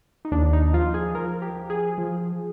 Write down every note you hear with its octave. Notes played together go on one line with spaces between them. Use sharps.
D#4
D#2 D4
D#4
F3 F4
G#4
F3 A#4
G4
F3
G#4
F3